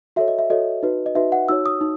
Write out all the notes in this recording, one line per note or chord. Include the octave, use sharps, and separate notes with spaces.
F#4 A4 C#5 E5
D#5
E5
F#4 A4 C#5 D#5
D#4 F#4 B4
D#5
D#4 F#4 B4 E5
F#5
D#4 F#4 C#5 E6
D#6
D#4